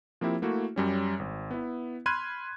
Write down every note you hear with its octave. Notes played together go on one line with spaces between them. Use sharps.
F3 A#3 C4 E4 G4
A3 A#3 E4 F#4
F#2 G3 C#4
G#1
B3 E4
B5 C6 F6 F#6 G#6 D#7